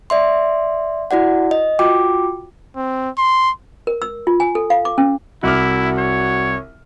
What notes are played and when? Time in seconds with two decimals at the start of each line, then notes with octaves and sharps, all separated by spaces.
0.10 D5 E5 C6
1.11 E4 F#4 D5 F#5
1.51 D#5
1.79 F4 F#4 G5 D6
2.76 C4
3.18 C6
3.87 A#4
4.02 E6
4.27 F4
4.40 G#5
4.55 A4
4.70 F5
4.85 D6
4.98 C#4
5.43 C2 E4 F#4 D6 F6
5.98 C#5